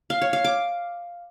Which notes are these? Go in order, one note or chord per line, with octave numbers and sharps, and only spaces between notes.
F5
C#5
F5
D6